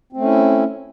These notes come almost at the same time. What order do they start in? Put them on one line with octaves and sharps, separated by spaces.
C4 A3 C#4 E4